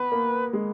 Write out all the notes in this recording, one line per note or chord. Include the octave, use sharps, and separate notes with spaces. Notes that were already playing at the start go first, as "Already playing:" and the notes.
Already playing: B3 B4
A#3
G#3